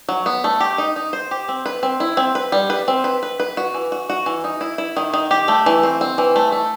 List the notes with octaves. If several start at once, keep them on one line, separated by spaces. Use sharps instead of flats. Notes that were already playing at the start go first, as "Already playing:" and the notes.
F#3
B3
A3
G4
D#4
D#4
C5
G4
C4
B4
C4
E4
C4
B4
G3
B4
C4
B4
B4
B4
F#4
E3
F#4
F#4
E3
D#4
E4
E4
D#3
D#3
G4
A3
E3
C4
C4
E3
A3
A3